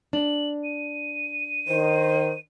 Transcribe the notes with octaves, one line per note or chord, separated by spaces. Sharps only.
D4 F#7
D#7
D#3 C5